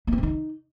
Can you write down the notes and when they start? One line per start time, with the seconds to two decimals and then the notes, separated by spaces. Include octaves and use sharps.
0.07 B3
0.13 C4
0.18 D#3
0.23 D#4